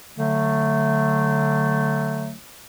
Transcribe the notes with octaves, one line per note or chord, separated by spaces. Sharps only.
D3 F#3 A3